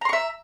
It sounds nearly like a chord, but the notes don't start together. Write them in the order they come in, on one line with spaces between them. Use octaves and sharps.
A#5 C6 C#6 E5